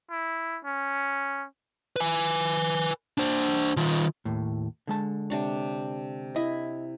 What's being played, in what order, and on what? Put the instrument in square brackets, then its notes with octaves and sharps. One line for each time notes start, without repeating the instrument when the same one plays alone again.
[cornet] E4
C#4
[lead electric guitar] B4 G#5
D4 C5
D#3 F4
[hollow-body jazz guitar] D#2 A2
D3 G#3 A5
[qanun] C3 D4 C#5
[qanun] E4 [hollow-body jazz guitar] D#5